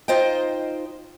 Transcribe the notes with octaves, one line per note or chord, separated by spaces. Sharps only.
D#4 F4 C5 D#5 G5